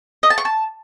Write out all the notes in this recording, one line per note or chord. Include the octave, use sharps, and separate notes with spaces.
D#5
A5
C#6
A5